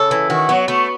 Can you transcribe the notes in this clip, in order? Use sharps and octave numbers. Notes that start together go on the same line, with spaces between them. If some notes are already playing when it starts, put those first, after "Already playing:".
Already playing: C#3 A4
E3
D#3 F#4
F#3 B3
A3 B3